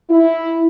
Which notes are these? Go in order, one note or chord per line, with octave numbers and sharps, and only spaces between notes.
E4